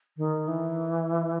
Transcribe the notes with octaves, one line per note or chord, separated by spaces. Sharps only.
D#3
E3